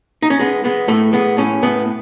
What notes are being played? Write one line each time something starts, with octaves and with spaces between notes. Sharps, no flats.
D#4
C#4
G#3 B3
G#3 B3
A2 A3
G#3 B3
A2 C#4
A2 B3